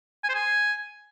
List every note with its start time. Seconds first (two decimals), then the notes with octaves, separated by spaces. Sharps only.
0.24 G#5
0.29 C5
0.35 G#5